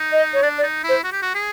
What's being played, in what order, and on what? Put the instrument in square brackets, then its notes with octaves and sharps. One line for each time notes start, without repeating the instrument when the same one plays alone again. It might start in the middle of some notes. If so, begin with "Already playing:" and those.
Already playing: [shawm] D#4
[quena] D#5
C#5
[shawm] D4 [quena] D5
[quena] D5
[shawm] D#4
[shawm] E4 [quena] C5
[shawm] F#4
G4
F#4
G#4